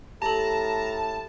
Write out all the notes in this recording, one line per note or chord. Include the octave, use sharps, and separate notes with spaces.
A2 G4 A4 A5 A#5